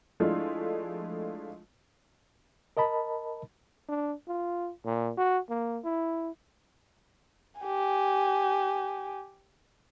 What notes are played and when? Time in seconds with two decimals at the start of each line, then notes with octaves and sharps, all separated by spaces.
0.20 F3 G#3 A3 D4 E4 F4
2.77 A#4 D#5 A5 B5
3.89 D4
4.28 F4
4.85 A#2
5.18 F#4
5.50 A#3
5.84 E4
7.61 G4 G#5